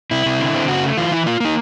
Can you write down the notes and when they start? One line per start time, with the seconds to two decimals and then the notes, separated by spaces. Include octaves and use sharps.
0.11 C3 E4
0.26 C3
0.40 D3
0.54 C4
0.68 C#3 F#4
0.83 A3
0.97 E3 F4
1.11 E3 E4
1.26 A#3 F4
1.40 A#3 D#4